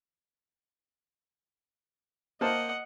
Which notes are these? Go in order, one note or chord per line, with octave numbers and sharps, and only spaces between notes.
A#3 C5 D#5 F#5 A5